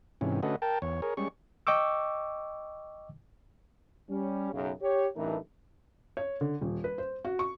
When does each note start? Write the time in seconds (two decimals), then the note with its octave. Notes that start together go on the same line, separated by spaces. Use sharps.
0.21 G#2 C3 E3 C#4
0.43 D3 A3 C#4 F#4 B4 D#5
0.62 A#4 G5 A5
0.82 E2 C#5
1.02 G#4 A#4 C#5
1.17 G3 G#3 C#4 C#6
1.67 D#5 G5 C#6 D6 E6
4.09 G3 C#4
4.53 B1 F#2 C#3
4.81 G4 C#5
5.16 A1 G2 E3 A3 D#4 A#4
6.17 C#5
6.41 D3
6.61 D#1
6.84 B4
6.98 C5
7.25 F#4
7.39 C#6